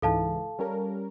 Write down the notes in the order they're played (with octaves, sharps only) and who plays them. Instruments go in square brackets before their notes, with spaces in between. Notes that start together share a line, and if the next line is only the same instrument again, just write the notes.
[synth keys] C#2 G#2 E3 [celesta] A4 F5 A5
[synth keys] G3 C#4 A#4